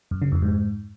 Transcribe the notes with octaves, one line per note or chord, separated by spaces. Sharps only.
F#2
C#3
F2
G#2